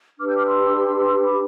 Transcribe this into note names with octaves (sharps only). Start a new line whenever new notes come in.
D4 G4 B4 D6 F6
E6 G6
D6 F6
C6 E6
B5 D6